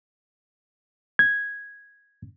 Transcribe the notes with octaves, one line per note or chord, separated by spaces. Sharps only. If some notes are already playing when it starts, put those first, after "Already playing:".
G#6